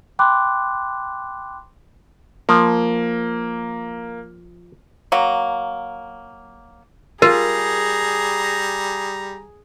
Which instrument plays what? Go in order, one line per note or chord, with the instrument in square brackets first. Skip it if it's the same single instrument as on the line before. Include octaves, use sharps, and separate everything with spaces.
[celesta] G5 B5 C6 D6 F#6
[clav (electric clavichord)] F3 [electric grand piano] A#3
[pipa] F#3 A#3
[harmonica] G3 A#5 [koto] F4 [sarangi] G#4 [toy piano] A#4